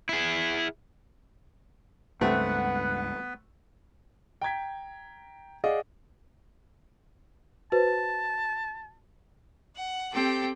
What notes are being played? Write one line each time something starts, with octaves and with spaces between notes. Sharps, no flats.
E4 G#4
C#2 G2 A3 B3 C4 B4 F#5
G5 A#5 G#6 B6
G#4 D5 D#5 F5 F#5
F#4 B4 C5 A5
F#5
C4 G4 A4 G5